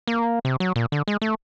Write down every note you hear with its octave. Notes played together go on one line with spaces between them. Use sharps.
A#3
C3
F#3
A#2
D3
G#3
A3